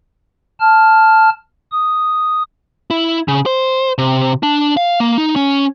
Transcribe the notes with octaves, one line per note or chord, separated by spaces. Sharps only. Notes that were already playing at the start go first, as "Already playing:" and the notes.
A5 F6
D#6
E4
C#3
C5
C3
D4
F5
A#3
D#4
C#4